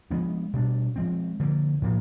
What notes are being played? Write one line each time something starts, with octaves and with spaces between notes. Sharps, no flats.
F3 G#3 B3 D4
B2 G3 B3 D4
F3 G#3 C4
D3 F3 A#3
A2 F3 A#3